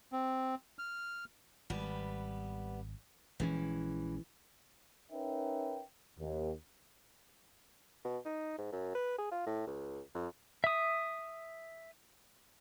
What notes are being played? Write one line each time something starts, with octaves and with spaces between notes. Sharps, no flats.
C4
F6
G#1 G3 B3 B4
A#1 E3 G#3 C#4
C#4 D#4 A#4 B4 E5 G5
D#2
B2
D#4
G#2
F#2
B4
G#4
F4
A2
C#2
F2
E5 D#6